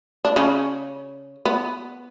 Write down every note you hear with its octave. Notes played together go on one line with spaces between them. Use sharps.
D4
C#3 C#4
B3